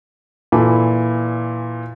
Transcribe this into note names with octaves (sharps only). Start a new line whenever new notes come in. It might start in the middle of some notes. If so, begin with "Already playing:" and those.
A#2 E3 A4 B5